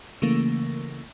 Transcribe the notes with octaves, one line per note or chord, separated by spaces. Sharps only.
C#3 E3 A3 A#3